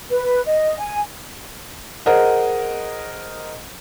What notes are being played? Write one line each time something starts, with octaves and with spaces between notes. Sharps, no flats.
B4
D#5
G#5
G#4 A#4 C5 D#5 F#5